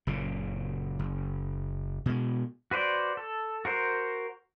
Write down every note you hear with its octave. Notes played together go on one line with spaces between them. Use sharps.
F#1 A#2 C#3
F#1
B2 G#3
F#4 B4 C5 D5
A4
F#4 A#4 C5